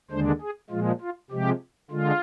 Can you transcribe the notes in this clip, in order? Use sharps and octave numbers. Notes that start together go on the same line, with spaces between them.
D#2 D3 G#3 D4 C5
G#4
A#2 F3 G#3 F4
F4
C3 F3 G#3 G4
D3 G#3 F4